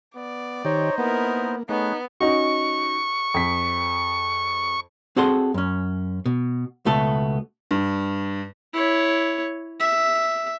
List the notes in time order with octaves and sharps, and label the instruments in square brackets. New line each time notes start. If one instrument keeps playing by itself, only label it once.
[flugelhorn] B3 [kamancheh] D5
[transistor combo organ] D#3 G4 [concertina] D#4 C5 D#5 [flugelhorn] C#5
[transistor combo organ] A#3 [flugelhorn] B3 [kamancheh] E4 A#4
[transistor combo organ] A3 [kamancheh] B3 [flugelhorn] D#4 [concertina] G#4 B4 C#5
[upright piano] C#4 D#4 F#4 [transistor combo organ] C#6
[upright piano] F2 B6
[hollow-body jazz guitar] C4 F#4 G#4 A4 F#5 C6
F#2 C#4
B2
C#2 B2 A3 B3 A4
[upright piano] G2
[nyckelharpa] E4 C#5
E5